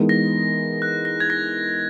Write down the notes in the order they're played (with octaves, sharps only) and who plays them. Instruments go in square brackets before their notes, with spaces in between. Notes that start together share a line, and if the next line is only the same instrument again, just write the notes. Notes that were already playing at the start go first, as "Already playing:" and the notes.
Already playing: [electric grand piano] E3 G#3 B3 D#4 A#4
[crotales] A#6
F#6
A#6
G#6
A#6